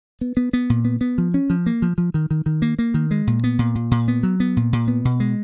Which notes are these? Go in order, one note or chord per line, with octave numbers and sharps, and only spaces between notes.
B3
B3
B3
A#2
B3
B3
F3
C#4
F3
A#3
F3
F3
D#3
D#3
D#3
A#3
A#3
D#3
G#3
A#2
B3
A#2
A#2
A#2
B3
F#3
B3
A#2
A#2
B3
B2
G#3